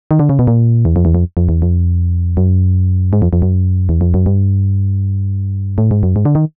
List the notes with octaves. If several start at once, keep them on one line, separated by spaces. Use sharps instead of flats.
D#3
D3
C#3
B2
A#2
E2
F2
E2
F2
F2
E2
F2
F#2
G#2
F2
F2
F#2
E2
F2
F#2
G2
A2
G#2
F#2
G#2
D3
D#3